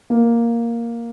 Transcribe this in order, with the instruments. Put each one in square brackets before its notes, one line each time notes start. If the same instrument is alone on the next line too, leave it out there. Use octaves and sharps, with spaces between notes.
[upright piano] A#3